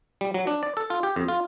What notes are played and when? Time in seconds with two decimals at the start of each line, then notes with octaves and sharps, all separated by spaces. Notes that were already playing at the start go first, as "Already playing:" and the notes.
0.21 G3
0.34 F#3
0.47 D4
0.63 D5
0.77 A4
0.90 F4
1.03 G4
1.16 F2
1.28 F4